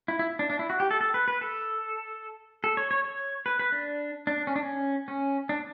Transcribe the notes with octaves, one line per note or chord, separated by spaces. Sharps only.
E4
E4
D4
D4
E4
F#4
G4
A4
A4
B4
B4
A4
A4
C#5
C#5
C#5
B4
B4
D4
D4
C#4
D4
C#4
C#4
D4